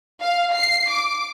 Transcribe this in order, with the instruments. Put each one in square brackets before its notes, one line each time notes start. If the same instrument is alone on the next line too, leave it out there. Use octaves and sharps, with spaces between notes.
[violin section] F5
C7
D6